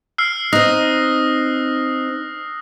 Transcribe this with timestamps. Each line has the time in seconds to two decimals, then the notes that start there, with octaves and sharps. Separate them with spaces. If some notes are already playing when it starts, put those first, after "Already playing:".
0.18 E6 F6 C7
0.53 C4 D#4 D#6 F#6 A#6